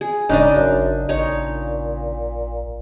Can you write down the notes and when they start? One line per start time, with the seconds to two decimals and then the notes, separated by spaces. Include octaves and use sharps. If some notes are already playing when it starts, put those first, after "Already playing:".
0.01 G#4
0.29 E1 C#3 D4 D#4 D#5
0.55 G#1 F#2
1.09 A1 A#2 D#4 C#5